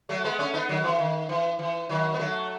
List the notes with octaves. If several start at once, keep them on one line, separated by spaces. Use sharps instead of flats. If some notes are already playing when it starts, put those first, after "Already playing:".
F#3 A3
G#3 B3
A3 C#4
B3 D#4
D#3 F#3
E3
D#3
E3
E3
D#3 F#3
B3
F#3 A3